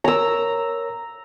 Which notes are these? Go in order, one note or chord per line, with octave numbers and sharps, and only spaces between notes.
A#4 C#5 A#5 E6